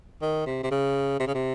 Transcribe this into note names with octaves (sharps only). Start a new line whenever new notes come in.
D#3
C3
C3
C#3
C3
C#3
C3